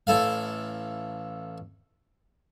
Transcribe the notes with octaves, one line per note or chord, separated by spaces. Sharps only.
A1 E4 A4 F5